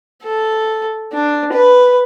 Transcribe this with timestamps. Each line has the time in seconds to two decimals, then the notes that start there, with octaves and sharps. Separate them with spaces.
0.22 A4
1.13 D4
1.53 B4